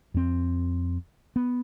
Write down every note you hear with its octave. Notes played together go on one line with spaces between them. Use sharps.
F2 C4
B3